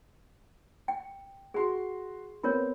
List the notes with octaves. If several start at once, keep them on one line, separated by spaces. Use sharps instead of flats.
G5
F#4 G#4 C6
B3 C4 F4 A#4 C#5